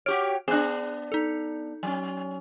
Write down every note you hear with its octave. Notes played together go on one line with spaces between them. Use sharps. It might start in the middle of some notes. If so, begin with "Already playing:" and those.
F#4 G4 C#5 F6 D7
B3 D4 G#4 F#6
D#4 A4
F#3 C#4